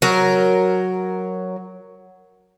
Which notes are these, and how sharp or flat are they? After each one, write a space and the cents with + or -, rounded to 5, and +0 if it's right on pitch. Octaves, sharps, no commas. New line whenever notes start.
F#3 +0 A#4 +0